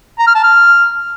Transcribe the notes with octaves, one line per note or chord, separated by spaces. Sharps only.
A#5
F6
A5
F6